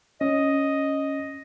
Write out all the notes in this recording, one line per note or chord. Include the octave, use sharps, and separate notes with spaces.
C#4 D#5